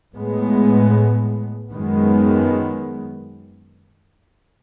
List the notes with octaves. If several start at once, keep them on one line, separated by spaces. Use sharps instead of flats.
A2 G#3 B3
F#2 D#3 G#3 B3